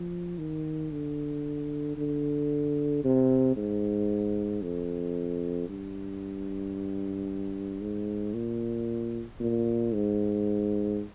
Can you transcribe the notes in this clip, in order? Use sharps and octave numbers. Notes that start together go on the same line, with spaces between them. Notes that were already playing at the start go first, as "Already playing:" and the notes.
Already playing: F3
D#3
D3
D3
C3
G#2
F2
G2
G#2
A#2
A#2
G#2